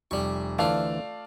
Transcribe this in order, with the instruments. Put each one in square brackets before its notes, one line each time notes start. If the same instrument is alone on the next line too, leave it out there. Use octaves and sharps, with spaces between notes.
[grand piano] F1 [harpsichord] G3 C#6
[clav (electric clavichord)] D2 E3 [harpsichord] A3 F4 [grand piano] D5 F5 A5